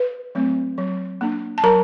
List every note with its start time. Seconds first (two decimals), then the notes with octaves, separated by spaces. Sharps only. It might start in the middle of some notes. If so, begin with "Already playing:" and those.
Already playing: B4
0.35 F#3 A3 C4
0.78 F#3
1.21 A#3 D4
1.58 A5
1.63 F#3 A#4 A#5